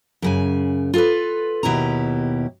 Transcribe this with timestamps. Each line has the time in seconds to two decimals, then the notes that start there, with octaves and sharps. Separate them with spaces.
0.22 F#2 C#3 G#5
0.94 F4 A4 B4
1.63 D#2 B2 E4 G4 A#5